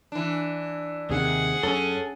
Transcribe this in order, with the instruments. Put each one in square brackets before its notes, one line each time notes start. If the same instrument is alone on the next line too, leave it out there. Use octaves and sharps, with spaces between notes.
[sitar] E3 D4
[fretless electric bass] D#2 C3 D#3 [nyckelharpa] G#4 F#5
[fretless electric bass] F#2 [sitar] C#4 [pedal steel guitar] A4 G#5